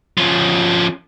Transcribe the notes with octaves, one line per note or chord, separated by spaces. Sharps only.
F3 C#4